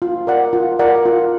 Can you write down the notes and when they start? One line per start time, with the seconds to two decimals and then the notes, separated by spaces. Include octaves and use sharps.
0.02 F4
0.27 A#4 D5 F#5
0.53 F4
0.79 A#4 D5 F#5
1.05 F4